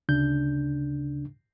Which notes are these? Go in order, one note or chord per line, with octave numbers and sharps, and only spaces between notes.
D2 C#3 D4 G6